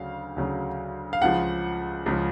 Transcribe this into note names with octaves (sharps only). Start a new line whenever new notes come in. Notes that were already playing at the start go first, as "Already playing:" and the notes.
Already playing: D2 C#3 F#3 F5
D2 C#3 F#3
F5
C#2 C#3 F3 F#5
C#2 C#3 F3